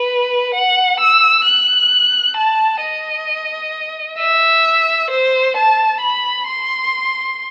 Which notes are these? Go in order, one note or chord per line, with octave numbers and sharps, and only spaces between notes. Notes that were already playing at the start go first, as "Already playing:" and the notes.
Already playing: B4
F#5
E6
F#6
A5
D#5
E5
C5
A5
B5
C6